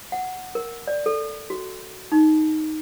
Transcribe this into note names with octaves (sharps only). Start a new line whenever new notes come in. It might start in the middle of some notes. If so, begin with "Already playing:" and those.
F#5
A#4
D5
A4
F#4
D#4